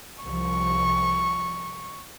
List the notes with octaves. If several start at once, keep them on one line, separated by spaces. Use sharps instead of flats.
C2 F3 C#6